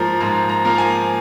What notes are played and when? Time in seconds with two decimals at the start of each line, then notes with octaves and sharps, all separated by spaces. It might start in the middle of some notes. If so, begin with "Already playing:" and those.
Already playing: G#2 F3 A#3 A#5
0.20 G#2 A#5
0.49 A#5
0.65 F3 A#3
0.78 G#5